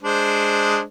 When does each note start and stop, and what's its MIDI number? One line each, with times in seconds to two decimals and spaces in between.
0.03 0.83 56
0.03 0.83 62
0.03 0.83 72